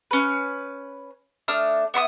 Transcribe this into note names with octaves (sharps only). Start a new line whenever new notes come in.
C#4 B4
A3 D4 D#6 F6
B3 E4 C6 D#6